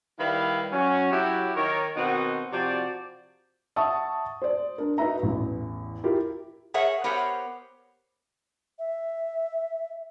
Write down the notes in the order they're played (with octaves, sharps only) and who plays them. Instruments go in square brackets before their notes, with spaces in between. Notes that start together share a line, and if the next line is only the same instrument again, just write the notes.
[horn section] D#3 G3 E4 B4 F5
F#3 C#4
F#3 E4 G4
D#3 A#4 C#5
B2 D#3 C4 D#4 F#4 F#5
C3 F3 F#4 C5 D5
[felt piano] E5 F#5 A5 C#6 D#6
C5 D5
D4 A#4
D#4 F#4 B4 E5 A#5
A1 E2
E4 F4 G4 A#4
[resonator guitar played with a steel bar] G#4 A#4 C#5 E5 F#5
B3 G4 A#4 C5 C#5 F#5
[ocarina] E5